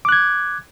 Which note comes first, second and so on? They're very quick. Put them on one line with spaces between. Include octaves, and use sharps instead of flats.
D6 F#6 G#6